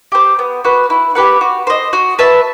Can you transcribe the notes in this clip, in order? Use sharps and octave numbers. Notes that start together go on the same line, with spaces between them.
G4 C5
B3
F#4 B4
E4
G4 B4 F#5
F#4
C5 D#5
F#4
B4 E5 A5